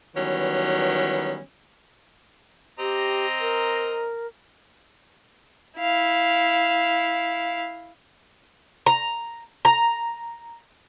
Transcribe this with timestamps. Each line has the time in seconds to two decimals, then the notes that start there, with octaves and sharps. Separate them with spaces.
0.16 D#3 E3 F#3 G3 B3 C#4
2.79 C4 G4 D#5 A#5
3.41 A#4
5.79 E4 F5
8.86 A#5
9.65 A#5